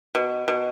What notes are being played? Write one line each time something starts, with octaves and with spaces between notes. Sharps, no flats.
B2
B2